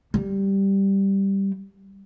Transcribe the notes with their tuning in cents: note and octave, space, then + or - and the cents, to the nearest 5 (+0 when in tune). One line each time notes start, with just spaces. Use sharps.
G3 +0